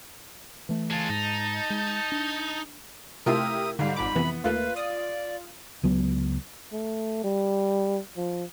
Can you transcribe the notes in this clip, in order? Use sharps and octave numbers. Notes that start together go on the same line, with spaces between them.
E3 A3
G#3 F4 A5
G#2 D#4
G#3
D4
C3 A3 E4 F4 G4 A#4 D#6
G#2 D3 G3 F5
G#1 F2 B5 D6
F2 C3 E3 B3
D#2 A3 A#3 F4 B4
D5 D#6
C#2 F#3 B3
A3
G3
F3